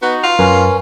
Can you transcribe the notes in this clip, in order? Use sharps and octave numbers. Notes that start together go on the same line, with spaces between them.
B3 D#4 F#4
F4 F#5
F#2 C#4 A#4 B4 G#5 C6